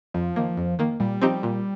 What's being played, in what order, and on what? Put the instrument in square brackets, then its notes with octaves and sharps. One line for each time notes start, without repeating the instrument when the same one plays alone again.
[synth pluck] F2 [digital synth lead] F3
[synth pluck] D#3 A#3
F2
D#3 A#3
[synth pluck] A#2 [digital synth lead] G3
[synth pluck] F3 C4 D#4 G4
A#2